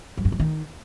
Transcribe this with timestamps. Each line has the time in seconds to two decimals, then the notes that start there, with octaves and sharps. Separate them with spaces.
0.17 F#3
0.25 G2
0.32 F#3
0.40 D#3